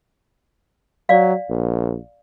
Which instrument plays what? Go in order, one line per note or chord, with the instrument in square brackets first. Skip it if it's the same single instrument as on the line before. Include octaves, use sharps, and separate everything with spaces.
[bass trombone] F#3 [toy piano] D5 F5
[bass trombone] A#1